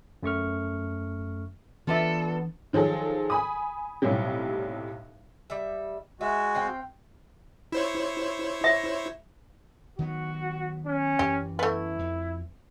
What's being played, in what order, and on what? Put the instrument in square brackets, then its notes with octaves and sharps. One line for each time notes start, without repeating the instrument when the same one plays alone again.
[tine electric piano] F#2 A3 C#6 F6
[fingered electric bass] E3 D4 [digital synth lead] B3 [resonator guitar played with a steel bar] F4 D5 E5 [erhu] A4
[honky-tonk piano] D#3 F3 F#3 G#4 A4
G#5 B5 D#6
B1 A2 C3 F#3 G3
[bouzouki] G3 E5
[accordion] G#3 F#4 [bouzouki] E5
[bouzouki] C4 F5 G5
[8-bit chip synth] E4 C5 C#5
[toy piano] E5
[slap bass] D#3 F#3 B3 [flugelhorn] F#4
[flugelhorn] C#4
[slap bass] F#2 E3 [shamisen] G4
[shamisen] A3 B3 [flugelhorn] E4
[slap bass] F2